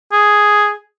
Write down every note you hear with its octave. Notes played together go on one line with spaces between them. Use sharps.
G#4